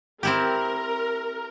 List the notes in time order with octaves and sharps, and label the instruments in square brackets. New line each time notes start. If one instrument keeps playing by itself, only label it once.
[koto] C4 E4 G4 [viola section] A#4